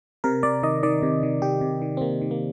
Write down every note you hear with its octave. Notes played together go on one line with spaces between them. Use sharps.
C3 A#4
C3 D5
D#3 D#5
D#3 D5
C3
D#3
D#3 G4
C3
D#3
C4
C3 A#3
D#3
A#3